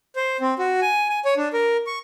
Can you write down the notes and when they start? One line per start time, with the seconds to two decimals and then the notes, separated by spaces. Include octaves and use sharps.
0.16 C5
0.41 C4
0.59 F#4
0.82 G#5
1.09 G#5
1.25 C#5
1.37 D4
1.53 A#4
1.87 C#6